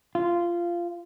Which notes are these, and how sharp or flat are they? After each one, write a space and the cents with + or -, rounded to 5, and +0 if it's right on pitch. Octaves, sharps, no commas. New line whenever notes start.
F4 -15